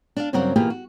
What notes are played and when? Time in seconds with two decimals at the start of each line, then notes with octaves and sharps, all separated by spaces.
0.16 D4 D5 F5
0.33 G2 C#3 F#3 C4 A#4 F#5
0.56 E2 B2 A#3 F4 G4 G#4
0.70 F#4